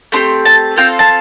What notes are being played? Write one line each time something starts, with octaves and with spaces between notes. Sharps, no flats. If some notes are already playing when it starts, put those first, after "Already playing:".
A3 C4 G4 C6
A5
C4 F4 A4 G5
A5